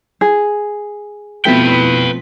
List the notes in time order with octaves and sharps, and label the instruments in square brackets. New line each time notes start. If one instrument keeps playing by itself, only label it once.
[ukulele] G#4
[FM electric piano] B2 E4 B6 [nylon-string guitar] F3 A3 C4 [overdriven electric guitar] B4 G5